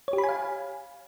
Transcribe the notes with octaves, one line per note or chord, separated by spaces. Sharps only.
C#5
G4
B5
G#5
F5